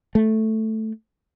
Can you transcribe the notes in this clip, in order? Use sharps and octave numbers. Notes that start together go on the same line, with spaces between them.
A3